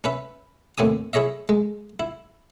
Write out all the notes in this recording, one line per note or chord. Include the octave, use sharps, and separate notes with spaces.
C#4 B4 E5
D#2 A2 C4 G#5 D#6
E4 G#4 C#5 D#5 E5
G#3
E4